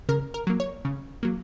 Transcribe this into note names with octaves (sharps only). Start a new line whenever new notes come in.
C#3 A#4
A#4
F#3 A#3
C#5
C#3
F#3 A#3